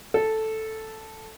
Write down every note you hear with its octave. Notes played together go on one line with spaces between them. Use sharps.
A4